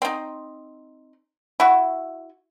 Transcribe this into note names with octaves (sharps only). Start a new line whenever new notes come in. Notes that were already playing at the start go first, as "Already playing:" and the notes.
C4 D#4
E4 F#4